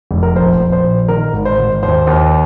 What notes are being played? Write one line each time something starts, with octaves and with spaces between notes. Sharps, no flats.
F1
A#4
A#1 C5
A#1
C5
A#2
D#3 A#4
G#1
C5
G#1
D#2 C5
D#2